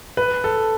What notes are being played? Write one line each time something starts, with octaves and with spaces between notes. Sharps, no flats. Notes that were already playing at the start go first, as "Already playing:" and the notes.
B4
A4